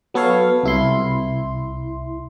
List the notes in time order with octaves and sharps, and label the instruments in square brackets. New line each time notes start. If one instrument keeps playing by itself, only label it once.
[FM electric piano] F#3 B3 A4 C#5 F5
C2 E4 C6